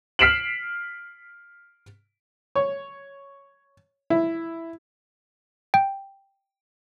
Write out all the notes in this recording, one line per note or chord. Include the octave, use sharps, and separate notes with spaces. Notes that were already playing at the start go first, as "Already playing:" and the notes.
F6 B6 C7 D7 E7 F#7
C#5
E4
G5